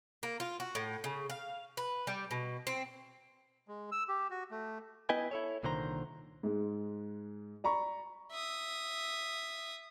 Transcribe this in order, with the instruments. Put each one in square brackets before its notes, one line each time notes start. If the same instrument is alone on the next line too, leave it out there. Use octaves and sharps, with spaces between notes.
[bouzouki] A#3
F4
F#4
A2
C#3
F5
B4
G3
B2
C4
[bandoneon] G#3
E6
G4
F#4
A3
[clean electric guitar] B3 E4 B4 D#5 G5 G#5
E4 A4 C#5
C2 A#2 D3 D#3 C5 A#5
[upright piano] G#2 G#3
D5 A#5 B5 C#6
[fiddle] E5 D#6